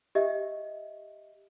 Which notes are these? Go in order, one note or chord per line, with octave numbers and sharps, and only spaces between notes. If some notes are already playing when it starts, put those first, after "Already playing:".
G4 D#5 E5